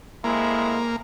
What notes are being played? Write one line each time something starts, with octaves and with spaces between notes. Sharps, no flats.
F2 G#3 A#3 E4